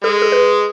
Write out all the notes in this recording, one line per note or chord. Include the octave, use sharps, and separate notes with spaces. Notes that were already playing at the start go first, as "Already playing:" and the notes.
G#3 A4
A4
B4